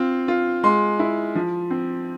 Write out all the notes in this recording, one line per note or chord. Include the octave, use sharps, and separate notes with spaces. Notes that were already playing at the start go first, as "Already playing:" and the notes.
Already playing: C4 F4
F4
G#3 C6
E4
F3
C4